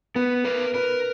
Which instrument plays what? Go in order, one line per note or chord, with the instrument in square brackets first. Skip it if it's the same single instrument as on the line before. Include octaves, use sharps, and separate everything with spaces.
[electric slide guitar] B3 [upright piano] B4
[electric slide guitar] A#4 [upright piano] B4
[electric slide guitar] A#4 [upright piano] B4